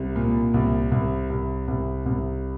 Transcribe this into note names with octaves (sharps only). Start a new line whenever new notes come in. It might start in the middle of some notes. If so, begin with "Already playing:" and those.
Already playing: C2
A#2
C2
C2
C2
C2
C2